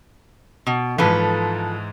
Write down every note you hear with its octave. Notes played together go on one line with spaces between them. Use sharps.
B2
G#2 E3 F3 A4 B4